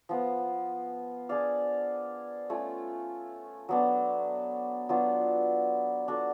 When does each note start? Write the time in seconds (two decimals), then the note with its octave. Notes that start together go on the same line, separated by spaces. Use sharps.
0.09 F3 B3 F4 B4
1.29 D4 G#4 D5 F5
2.50 A3 C#4 F4
3.69 F#3 B3 D4
4.89 F#3 B3 D4 F4
6.08 D4 F#4 A4